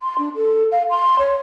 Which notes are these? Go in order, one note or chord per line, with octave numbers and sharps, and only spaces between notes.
C6
D4
A4
F5
C6
C#5